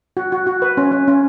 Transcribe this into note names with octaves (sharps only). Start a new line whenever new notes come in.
F#4
F#4
F#4
B4
C#4
C#4
C#4